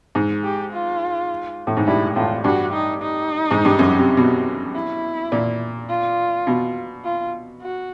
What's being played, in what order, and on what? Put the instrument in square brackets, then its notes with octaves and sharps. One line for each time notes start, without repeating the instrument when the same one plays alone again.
[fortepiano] G#2
[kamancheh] G4
F4
[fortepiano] A2
G#2
[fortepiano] G2 [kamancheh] E4
[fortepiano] A2 [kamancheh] F4
[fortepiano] G2 [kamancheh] F#4
[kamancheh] D#4
D#4
[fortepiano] G#2
G2
F#2
C3
B2
[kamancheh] E4
[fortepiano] A#2
[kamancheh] F4
[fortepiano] B2
[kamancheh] F4
F#4